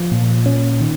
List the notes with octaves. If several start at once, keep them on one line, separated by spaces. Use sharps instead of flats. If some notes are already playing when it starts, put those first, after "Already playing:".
Already playing: F3
A#2
C#4
D#3